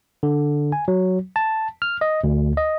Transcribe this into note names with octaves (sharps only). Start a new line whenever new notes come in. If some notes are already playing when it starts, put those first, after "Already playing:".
D3
G#5
F#3
A5
F6
D#5
D2
D#5